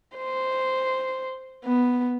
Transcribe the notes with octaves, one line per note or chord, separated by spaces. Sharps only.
C5
B3